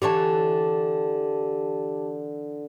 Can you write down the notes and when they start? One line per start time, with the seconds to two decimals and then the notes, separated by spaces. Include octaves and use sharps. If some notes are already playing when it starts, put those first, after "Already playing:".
0.02 D3 E3 G4 C#5 A5